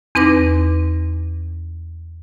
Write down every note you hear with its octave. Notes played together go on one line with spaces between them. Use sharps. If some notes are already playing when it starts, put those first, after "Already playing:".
E2 C4 D#4 B4 D6 A#6